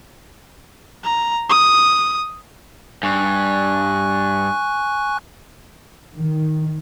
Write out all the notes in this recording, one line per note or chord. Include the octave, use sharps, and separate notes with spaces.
A#5
D#6
G2 G#5 C#6 F#6
D#3